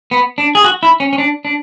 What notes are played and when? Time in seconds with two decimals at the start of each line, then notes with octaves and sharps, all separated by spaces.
0.11 B3
0.38 D4
0.55 G#4
0.64 F#4
0.83 E4
1.00 C#4
1.13 C#4
1.18 D4
1.45 D4